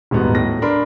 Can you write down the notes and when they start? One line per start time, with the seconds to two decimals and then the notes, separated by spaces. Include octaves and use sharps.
0.11 D#1 G#2 B3 F#4
0.35 A2 A#6
0.62 D4 A#4 B5 C6